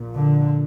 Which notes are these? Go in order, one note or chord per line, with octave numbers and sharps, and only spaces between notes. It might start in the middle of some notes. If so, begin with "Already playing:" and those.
Already playing: A#1 A#2
D3